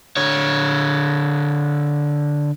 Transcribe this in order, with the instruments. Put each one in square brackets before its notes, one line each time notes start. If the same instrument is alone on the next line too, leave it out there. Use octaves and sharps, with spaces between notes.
[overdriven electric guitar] D3 C#5